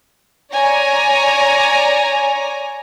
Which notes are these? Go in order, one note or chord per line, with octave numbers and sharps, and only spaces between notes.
C#5 D5 G#5 A#5